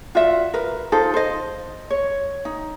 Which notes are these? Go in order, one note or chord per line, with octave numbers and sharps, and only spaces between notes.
F4 F#4 D5 E5
A#4 B4
D#4 F4 A4 C5
C5 D#5
C#5
D#4